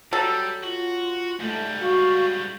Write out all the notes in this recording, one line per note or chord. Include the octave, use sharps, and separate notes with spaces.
F#3 G3 A4
F4 F#4
G#2 G3 A3
F#4 F5